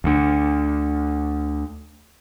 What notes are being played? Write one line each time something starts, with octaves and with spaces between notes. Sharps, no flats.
D2 D3